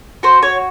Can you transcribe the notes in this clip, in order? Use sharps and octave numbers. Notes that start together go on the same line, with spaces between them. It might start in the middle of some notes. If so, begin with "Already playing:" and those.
F#4 C5
C#5